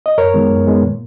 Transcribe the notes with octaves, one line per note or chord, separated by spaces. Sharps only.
D#5
F#2 A#4 C#5
D#3 G#3 B3
F#2
D#3 G#3 B3
A#2